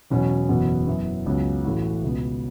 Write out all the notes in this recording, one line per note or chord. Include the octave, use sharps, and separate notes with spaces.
E1 E2 B2 F#3 C#4
F#1 E2 B2 F#3 B3
F#2 F#3 B3 E4
C#2 C#3 F#3 B3
A1 A2 A3 F#4
C#2 B2 B3